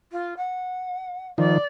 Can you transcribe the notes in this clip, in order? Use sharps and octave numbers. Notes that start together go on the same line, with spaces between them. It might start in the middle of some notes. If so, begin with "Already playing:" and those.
F4
F#5
D#3 F3 D5